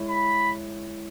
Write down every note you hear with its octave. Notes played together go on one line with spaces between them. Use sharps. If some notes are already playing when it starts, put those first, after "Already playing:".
Already playing: G#3 E4 C#5
B5